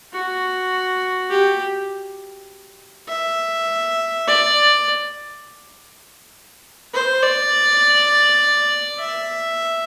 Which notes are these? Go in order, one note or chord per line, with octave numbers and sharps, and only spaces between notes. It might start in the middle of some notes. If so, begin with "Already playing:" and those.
F#4
G4
E5
D5
C5
D5
E5